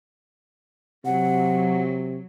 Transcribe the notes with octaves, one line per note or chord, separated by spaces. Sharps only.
C3 F#3 F#5